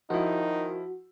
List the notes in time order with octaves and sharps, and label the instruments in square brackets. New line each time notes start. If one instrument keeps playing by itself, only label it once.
[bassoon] D#3 [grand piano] F3 E4 [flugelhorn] D#4 [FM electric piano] F#4